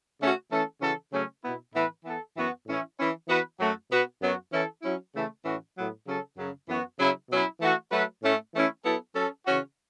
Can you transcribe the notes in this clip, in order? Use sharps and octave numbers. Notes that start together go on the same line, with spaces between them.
C#3 A3 C#4 F#4
E3 A3 C#4 A4
C#3 E3 C#4 F#4 A4
C#3 F#3 A3 C#4
B2 B3 E4
A2 E3 B3 E4 B4
E3 B3 A4
F#2 E3 B3 F#4
A2 E3 C#4 E4
E3 C#4 E4
E3 B3 F#4 B4
F#2 F#3 A3 F#4
B2 B3 F#4 B4
F#2 F#3 B3 F#4
E3 C#4 E4 A4
F#3 C#4 E4
C#3 E3 A3
A2 E3 C#4 F#4
A2 F#3 B3
C#3 F#3 C#4 A4
F#2 C#3 F#3
F#2 E3 B3 F#4
C#3 F#3 C#4 E4
B2 F#3 C#4 E4
E3 A3 F#4
F#3 A3 F#4 B4
A2 A3 C#4
E3 A3 C#4 E4
F#3 B3 E4 A4
F#3 C#4 A4
C#3 E3 C#4 F#4